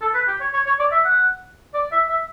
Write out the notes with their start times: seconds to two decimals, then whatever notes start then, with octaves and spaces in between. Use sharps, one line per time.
0.01 A4
0.14 B4
0.28 G4
0.41 C#5
0.53 C#5
0.66 C#5
0.80 D5
0.92 E5
1.05 F#5
1.74 D5
1.92 E5
2.09 E5